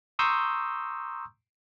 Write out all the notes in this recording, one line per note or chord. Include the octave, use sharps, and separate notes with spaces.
A#5 C6 C#6 D#6 E6 G6